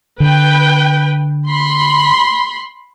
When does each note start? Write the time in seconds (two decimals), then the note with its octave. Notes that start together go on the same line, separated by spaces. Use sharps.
0.20 D3 B4 G5
1.46 B5 C6